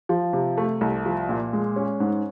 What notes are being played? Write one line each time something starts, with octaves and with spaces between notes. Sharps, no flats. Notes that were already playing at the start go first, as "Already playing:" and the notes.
F3
C3
A3
C2
F3
A#2
G#3
C#4
G#2